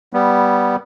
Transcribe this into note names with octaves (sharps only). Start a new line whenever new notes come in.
G3 B3